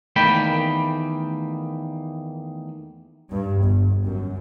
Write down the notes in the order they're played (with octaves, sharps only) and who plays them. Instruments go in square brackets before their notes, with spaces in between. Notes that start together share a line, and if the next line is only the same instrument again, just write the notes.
[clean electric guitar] E2 D#3 A3 A#3 G5 B5
[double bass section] G2
G1
F#2